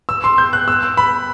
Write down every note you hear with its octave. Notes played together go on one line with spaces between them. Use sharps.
E6
C6
G6
F#6
E6
B5